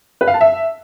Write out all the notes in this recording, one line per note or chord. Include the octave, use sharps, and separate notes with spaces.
B4
F5
A5
E5